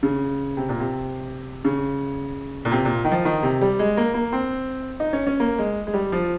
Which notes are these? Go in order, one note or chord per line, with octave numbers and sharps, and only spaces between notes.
C#3
C3
A#2
C3
C#3
A#2
C3
A#2
D#3
F3
D#3
C3
G3
G#3
A#3
A#3
C4
D#4
C#4
C#4
A#3
G#3
G#3
G3
F3